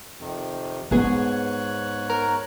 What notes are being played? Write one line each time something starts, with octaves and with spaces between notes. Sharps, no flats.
F2 C3 D#3
G#2 G#3 B3 G#4 C#5 F#6
A#4